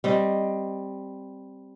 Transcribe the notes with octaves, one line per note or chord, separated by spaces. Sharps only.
G3 C4 D#5